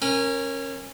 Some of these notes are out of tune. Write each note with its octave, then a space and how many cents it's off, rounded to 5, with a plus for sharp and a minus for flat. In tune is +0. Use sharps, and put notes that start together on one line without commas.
C#4 -20 A#4 +0